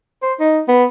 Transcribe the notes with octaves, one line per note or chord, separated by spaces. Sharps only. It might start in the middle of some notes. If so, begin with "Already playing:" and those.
C5
D#4
B3